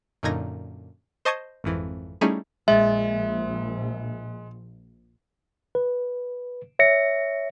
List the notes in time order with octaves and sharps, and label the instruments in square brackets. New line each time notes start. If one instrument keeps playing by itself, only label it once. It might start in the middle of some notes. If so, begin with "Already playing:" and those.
[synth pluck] F#2 A#2 D3 D#4 G#6 A#6
C5 D#5 A5 C#6 D#6 G#6
G#1 F2 E3
G3 A3 C#4 D#4 E4 G#4
[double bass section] A#1 [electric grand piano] G#3 [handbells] E5
[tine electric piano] B4
C#5 E5 A#6 C#7